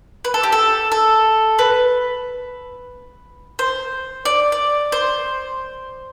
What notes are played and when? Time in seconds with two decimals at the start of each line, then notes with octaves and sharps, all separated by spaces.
0.24 B4
0.34 A4
0.43 G4
0.52 A4
0.92 A4
1.59 B4
3.59 C5
4.25 D5
4.52 D5
4.92 C5